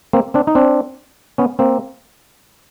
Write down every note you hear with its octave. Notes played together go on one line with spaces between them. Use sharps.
A#3 C4
C4 D4
D#4
C4 D4
B3 C#4
A#3 C4